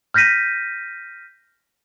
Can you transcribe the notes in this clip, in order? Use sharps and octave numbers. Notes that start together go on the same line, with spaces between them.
F6 G6 A#6 B6 D#7